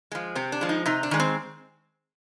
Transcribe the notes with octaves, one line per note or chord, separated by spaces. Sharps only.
F3 G#3
C3 C4
D4
F3 G#3
D#4
C3 D#4
D4
D#3 G#3
C4